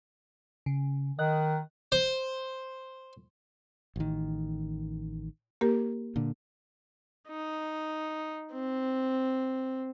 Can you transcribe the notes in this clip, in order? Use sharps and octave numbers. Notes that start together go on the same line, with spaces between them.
C#3
D#3 D#5 F#6
C5
A1 D#3
A#3 G4 A#4
A#2 D3
D#4
C4